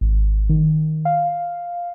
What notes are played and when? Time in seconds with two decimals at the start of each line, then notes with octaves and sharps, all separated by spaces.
0.01 G#1
0.49 D#3
1.05 F5